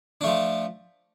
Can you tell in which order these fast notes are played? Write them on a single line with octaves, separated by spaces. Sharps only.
D4 A3 F3